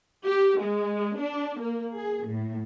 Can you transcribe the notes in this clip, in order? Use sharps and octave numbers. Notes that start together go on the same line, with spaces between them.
G4
G#3
D4
A#3
G#4
A2